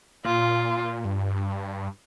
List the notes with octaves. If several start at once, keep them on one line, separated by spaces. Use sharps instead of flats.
A#2 F4
G2